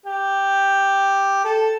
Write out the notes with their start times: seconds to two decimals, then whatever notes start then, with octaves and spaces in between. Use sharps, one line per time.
0.06 G4
1.45 A4